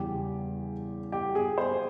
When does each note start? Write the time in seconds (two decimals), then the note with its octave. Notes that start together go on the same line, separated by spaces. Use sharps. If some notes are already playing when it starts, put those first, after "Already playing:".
Already playing: E2 C#3 G3 G4
1.12 G4
1.35 G#4
1.58 C5